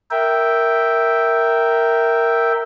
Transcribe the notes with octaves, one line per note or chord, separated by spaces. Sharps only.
A#4 E5 G5